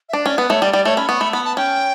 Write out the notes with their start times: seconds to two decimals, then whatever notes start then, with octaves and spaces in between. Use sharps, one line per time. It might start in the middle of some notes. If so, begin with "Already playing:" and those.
0.09 E5
0.13 D4 D5
0.26 C#4 D5
0.38 B3 B4
0.50 A3 C#5
0.62 G3 D5
0.73 G3 D5
0.85 A3 C#5
0.97 C#4 B5
1.09 B3 C#6
1.20 A3 B5
1.32 B3 B5
1.45 A5
1.57 C#4 G5